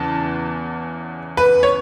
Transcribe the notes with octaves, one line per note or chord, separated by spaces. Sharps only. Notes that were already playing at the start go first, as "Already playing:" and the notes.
Already playing: E2 C#3 E3 A5
B4
C#5